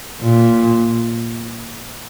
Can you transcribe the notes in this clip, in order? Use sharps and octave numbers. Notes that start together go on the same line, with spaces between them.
A#2